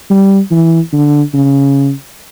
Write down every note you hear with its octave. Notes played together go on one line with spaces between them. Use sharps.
G3
E3
D3
C#3